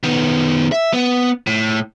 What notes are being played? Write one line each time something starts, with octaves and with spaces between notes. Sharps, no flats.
D#3 B3
E5
B3
A2